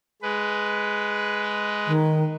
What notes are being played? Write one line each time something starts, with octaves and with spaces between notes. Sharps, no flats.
G#3 B4
D#3